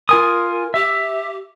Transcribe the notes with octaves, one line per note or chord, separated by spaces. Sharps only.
F4 A#4 G#5 D#6
G4 E5